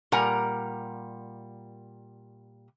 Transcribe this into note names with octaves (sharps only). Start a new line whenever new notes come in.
A#2 G3 A#4 F#5 G#5 A#5